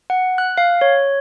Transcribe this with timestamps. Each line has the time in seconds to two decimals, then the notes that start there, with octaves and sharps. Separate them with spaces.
0.10 F#5
0.38 F#6
0.58 F5
0.81 C#5